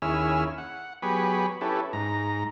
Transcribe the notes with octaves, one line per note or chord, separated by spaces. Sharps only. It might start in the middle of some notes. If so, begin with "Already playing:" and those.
D#2 C#4 E4 G#4 E6 F6
F#5
F#3 B3 G4 G#4 B5 C#6
C#4 E4 G4 A4 B4
G#2 A#5